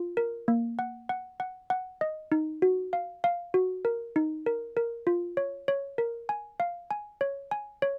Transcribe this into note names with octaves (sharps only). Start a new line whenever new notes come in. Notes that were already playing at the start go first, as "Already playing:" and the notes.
Already playing: F4
A#4
A#3
F#5
F#5
F#5
F#5
D#5
D#4
F#4
F5
F5
F#4
A#4
D#4
A#4
A#4
F4
C#5
C#5
A#4
G#5
F5
G#5
C#5
G#5
C#5